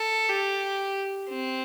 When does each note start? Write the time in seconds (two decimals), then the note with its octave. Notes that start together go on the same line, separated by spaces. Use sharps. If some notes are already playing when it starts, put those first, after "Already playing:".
Already playing: A4
0.29 G4
1.30 C4